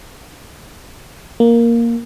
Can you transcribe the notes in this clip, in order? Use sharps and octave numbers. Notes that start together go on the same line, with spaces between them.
A#3